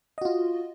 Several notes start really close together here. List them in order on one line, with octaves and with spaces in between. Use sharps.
D#5 F#4 F4